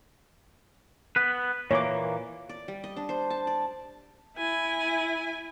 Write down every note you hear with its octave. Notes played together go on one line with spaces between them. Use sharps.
B3 B4
A#2 E3 A#3 C#5 D6
D5
G3
D#5
D4
C5
A5
D5
E4 G#5